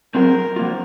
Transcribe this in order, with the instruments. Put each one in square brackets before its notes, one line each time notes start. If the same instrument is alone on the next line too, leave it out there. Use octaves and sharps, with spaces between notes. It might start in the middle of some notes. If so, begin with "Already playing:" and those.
[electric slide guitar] F#3 C4 F4 G#4 [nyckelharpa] A#4
[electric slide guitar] F3 A#3 F4